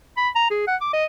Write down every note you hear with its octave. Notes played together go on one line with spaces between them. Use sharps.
B5
A#5
G#4
F#5
D6
D#5